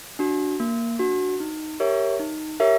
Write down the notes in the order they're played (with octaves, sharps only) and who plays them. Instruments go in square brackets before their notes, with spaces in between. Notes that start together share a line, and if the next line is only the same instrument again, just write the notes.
[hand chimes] D4 F#4
A#3
D4 F#4
D#4
G4 A#4 C#5 E5
D#4
G4 A#4 C#5 E5